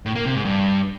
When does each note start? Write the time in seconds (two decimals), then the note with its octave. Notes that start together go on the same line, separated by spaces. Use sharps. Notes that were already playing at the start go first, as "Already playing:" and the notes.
0.06 A2
0.15 A#3
0.25 C3
0.35 G#2
0.45 G2